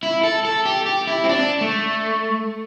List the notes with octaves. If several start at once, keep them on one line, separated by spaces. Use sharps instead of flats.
E4
A4
A4
G4
G4
E4
C4
D4
A3